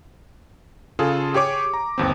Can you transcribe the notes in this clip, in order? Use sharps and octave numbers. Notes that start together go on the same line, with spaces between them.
C#3 F4 G#4 A4
G4 G#4 C#5 D6
A#5
G1 D#2 C4